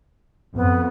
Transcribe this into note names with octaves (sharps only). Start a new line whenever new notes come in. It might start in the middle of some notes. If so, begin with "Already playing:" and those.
F2 B3